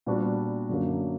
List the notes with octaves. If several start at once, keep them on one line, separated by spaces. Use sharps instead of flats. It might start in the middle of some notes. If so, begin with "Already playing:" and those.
A#2 G3 B3 D4 F#4
F#2 D3 F#3 A#3